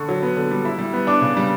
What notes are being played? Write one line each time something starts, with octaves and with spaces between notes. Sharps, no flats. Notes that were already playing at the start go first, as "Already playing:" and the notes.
Already playing: D3 C#6
F#3
B3
D3
G3
E4
G3
B3
D4 D6
C#3
G3